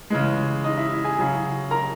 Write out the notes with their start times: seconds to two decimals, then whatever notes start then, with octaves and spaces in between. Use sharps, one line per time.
0.10 C#3 E3 G#3
0.64 D#4 D#5
0.77 E4 E5
1.04 G#4 G#5
1.18 C#3 F#3
1.71 A#4 A#5